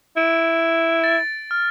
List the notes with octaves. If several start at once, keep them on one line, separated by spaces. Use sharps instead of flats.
E4 D7
A6
F6